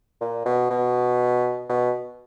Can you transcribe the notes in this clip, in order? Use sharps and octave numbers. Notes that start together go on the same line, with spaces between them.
A#2
B2
B2
B2